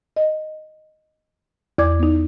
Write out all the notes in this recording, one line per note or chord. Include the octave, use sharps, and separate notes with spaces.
D#5
E2 D5 D6 G#6
B3 D#4